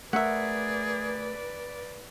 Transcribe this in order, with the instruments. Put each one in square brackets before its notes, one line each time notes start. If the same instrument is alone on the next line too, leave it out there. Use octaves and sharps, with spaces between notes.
[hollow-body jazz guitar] A3 A#4 [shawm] G#4 [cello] B4 D5 [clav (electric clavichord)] E5 F#5